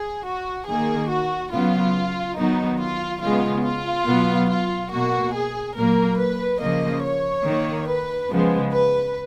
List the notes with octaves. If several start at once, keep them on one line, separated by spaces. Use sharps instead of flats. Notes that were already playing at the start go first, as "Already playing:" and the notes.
Already playing: G#4
F#4
D#3 A#3 G#4
F#4
C#3 F#3 B3 F4
D#3 F#3 B3 D#4
F4
C#3 G#3 B3 F4
F4
B2 F#3 B3
F4
B2 A#3 F#4
G#4
A#2 F#3 A#3 A#4
B4
C#3 F3 A#3 D#5
C#5
D#3 A#3
B4
C#3 F3 G#3 B3
B4